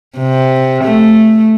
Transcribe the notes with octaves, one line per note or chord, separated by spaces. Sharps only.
C3
A3